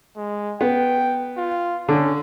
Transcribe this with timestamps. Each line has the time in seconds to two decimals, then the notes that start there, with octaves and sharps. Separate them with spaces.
0.17 G#3
0.61 B3 G5
1.37 F4
1.89 D3 C#4